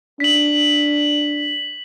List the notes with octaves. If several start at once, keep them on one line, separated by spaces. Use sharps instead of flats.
D4 B6 F#7